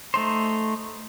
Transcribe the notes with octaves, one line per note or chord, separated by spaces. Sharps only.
A3 D#4 C5